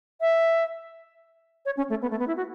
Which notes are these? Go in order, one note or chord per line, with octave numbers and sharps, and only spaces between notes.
E5
C#5
C#4
A3
B3
A3
B3
E4
F#4